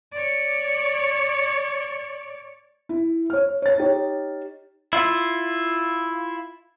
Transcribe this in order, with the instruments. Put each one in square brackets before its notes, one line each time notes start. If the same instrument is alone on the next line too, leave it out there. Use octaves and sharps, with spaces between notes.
[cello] C#5 D5
[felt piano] E4
C#5 F6
C#5 A6
D#4 G4 C#5
[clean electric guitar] E4 F4